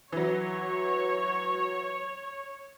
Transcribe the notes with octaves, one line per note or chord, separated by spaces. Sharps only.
E3 F#3 C#5